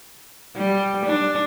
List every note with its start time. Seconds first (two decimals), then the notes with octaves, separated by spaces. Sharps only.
0.56 G3
1.06 D4